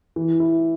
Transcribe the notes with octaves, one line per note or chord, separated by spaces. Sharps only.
E3
E4